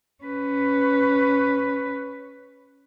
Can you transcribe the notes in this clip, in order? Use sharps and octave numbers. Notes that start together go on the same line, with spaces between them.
C#4 B4